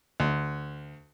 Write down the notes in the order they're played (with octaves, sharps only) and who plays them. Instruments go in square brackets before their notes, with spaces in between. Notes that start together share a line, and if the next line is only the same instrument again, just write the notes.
[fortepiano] D2